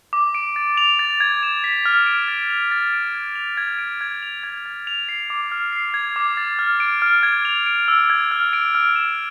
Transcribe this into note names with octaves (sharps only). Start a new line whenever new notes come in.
D6
D7
A6
F7
A6
G#6
E7
B6
F6
D7
A6
F7
A6
D7
G#6
F7
G#6
D7
G#6
F7
G#6
A6
F7
C7
D6
F6
C7
G#6
D6
A6
F6
D7
F6
G#6
F7
D7
E6
G#6
F6
D7
F6
E7